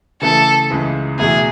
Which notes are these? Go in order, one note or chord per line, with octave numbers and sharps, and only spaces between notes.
C#3 E3 A3 A4
C#2 C#3 E3 G#3
E2 B2 A3 E4 G#4